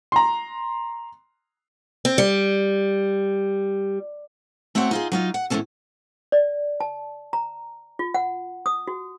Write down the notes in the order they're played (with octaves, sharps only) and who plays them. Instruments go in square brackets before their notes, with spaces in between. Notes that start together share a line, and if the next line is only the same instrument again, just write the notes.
[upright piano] A#5 C6
[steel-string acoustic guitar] C4
G3
A3 C4 F#4 C#5 F#5
D#4 F4 G#4
F#3 D#4 F4
F#5
E2 A2 G#3 A#3 C#4 A4
[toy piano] D5
A5
A#5
F4
F#5
D#6
F#4